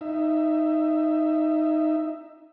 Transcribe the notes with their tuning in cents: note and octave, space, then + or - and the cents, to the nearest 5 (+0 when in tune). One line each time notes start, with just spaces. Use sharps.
D#4 +0 E5 +20